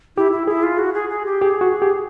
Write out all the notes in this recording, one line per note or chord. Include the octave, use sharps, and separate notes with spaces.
E4 G4
E4
E4 G#4
F4
F#4
G#4
G#4
G4
G4 G#4
F#4
G4